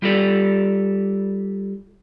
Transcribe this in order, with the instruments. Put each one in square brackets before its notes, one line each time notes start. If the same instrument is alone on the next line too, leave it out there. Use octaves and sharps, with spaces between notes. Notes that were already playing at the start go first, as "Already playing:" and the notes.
[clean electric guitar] G3 F4 G4 A4 D5